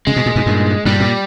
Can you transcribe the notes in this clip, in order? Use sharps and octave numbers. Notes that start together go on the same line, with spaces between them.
C#3 G#3
B2
A#2
G#2 B2
G2 A#2
G2 A#2 G3
A#2